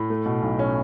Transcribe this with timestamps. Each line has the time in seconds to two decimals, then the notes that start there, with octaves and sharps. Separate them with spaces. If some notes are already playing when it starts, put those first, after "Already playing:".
Already playing: A2
0.10 A3
0.26 B2
0.42 B1
0.59 C#4